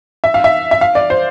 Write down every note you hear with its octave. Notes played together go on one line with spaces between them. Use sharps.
E5
F5
E5
E5
F5
D5
C5